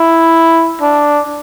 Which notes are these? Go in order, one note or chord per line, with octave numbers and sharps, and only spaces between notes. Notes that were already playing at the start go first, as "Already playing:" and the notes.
Already playing: E4
D4